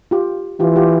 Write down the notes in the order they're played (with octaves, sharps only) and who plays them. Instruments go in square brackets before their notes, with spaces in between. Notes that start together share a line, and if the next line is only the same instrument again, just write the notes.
[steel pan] F4 G4
[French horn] E3 [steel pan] F4 G4
[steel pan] F4 G4